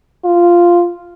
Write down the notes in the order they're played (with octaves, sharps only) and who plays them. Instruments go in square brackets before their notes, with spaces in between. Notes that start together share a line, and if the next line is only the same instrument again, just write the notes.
[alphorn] F4